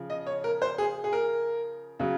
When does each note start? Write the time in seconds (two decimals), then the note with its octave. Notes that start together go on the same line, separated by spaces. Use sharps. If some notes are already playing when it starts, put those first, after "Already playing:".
Already playing: C#3 F3
0.10 D#5
0.27 C#5
0.44 A#4
0.62 C5
0.78 G#4
1.04 G#4
1.13 A#4
1.99 C#3 F#3